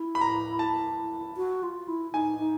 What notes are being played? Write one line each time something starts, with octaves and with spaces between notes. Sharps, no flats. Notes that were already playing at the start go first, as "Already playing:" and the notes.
Already playing: E4
B5
A#5
A5
F#4
F4
E4
D#4 G#5
D#4